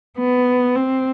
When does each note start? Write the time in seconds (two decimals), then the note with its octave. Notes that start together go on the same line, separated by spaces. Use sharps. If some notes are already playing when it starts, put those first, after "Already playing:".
0.18 B3
0.75 C4